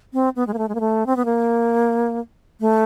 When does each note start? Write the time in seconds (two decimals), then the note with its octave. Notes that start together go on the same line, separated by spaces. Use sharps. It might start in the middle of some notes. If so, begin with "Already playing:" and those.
0.13 C4
0.36 B3
0.47 G#3
0.54 A#3
0.58 A3
0.69 G#3
0.75 A#3
0.80 A3
1.06 C4
1.16 B3
1.25 A#3
2.61 A3